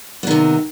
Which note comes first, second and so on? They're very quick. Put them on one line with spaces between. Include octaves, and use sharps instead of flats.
B3 D#3 C3